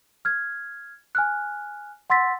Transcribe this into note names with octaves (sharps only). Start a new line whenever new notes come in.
F6 G#6
G#5 F6 F#6
F#5 C6 E6 A6 B6